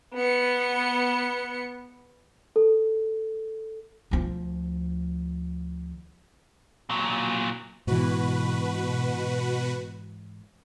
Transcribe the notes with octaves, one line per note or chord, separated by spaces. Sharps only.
B3 C#7
A4
D2 F3
A#2 F#3
G#2 B2 E3 F#4 B4